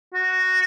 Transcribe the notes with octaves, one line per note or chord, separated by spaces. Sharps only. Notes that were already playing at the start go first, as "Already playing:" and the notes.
F#4